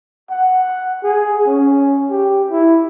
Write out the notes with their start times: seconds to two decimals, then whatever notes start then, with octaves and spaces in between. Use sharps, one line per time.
0.30 F#5
1.03 G#4
1.47 C#4
2.10 G4
2.51 E4